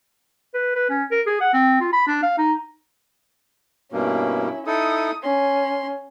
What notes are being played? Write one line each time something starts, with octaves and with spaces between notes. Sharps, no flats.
B4
B4
C#4
A#4
G#4
F#5
C4
F4
B5
D4
F5
D#4
G2 B2 A#3 C#4 E4
D#4 E4 A4 D#6
C#4 C6